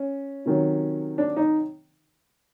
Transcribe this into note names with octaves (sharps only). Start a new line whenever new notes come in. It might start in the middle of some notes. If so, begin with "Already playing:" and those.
Already playing: C#4
C3 D#3 F#3
D4
D#4